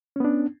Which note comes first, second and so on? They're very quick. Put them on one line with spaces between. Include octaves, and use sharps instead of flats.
C#4 B3 D4